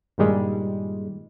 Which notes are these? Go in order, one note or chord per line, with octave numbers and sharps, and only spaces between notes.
G2 A#2 D#3 G3 G#3